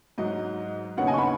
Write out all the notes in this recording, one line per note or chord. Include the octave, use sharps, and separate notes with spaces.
G#2 F#3 D#4 D#5
D#2 C#3 B3 D#4 C#5 F#5
D#5 G#5
C#6
F#5 B5